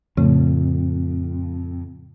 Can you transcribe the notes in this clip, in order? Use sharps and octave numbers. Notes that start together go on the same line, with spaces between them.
F2 A2 C#3 A3